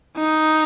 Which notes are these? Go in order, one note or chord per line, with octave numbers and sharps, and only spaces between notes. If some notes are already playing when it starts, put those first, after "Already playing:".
D#4